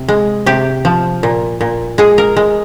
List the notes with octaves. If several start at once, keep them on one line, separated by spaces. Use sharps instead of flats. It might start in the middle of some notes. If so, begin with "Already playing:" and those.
Already playing: C3
G#3
C3 G4
F3
A#2
A#2
G#3 G#4
A#4
G#3